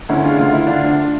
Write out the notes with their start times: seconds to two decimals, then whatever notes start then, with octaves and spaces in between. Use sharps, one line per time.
0.09 D2 C#4 E4
0.24 C#3 D4 F4
0.39 D2 F4
0.53 D2 E4
0.67 D2 D4 F4
0.84 D2